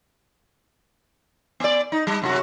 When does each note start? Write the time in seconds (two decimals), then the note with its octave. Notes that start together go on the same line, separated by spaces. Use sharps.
1.60 B3 D5
1.92 D#4
2.07 G3
2.22 F#2 C3 F#4